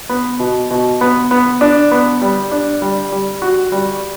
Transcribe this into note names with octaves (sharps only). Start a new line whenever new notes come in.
B3
B2
B2
B3
B3
D4
B3
G3
D4
G3
G3
F#4
G3